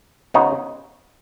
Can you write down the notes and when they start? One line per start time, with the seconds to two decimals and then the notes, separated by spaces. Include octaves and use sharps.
0.34 C#3 G#3 B3 D#4 F#4